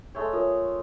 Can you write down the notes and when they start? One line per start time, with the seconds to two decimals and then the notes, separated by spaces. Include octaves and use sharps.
0.15 G#3 A3 C#5
0.33 F4 A#4 C#5 D#6